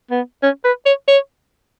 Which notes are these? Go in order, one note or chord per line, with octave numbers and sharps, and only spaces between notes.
B3
C#4
B4
C#5
C#5